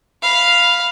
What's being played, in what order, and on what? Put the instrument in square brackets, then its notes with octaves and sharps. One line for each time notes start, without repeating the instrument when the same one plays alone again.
[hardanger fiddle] F5 B5